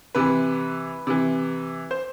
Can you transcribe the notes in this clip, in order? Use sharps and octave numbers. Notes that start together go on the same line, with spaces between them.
C3 E3 B4
C3 E3
C5